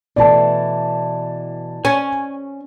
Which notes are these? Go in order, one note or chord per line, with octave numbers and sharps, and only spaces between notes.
B2 E3 A3 D5 A5
C#4 G#5